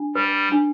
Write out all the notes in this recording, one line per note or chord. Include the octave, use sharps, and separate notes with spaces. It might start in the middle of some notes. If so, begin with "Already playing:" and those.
Already playing: D4
G3 B4
D4